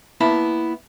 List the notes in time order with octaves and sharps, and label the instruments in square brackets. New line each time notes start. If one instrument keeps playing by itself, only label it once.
[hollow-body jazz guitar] A#3 B3 E4 A5 B5